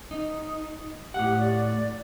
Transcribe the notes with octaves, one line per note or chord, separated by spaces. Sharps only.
D#4
A2 G4 F#5
D5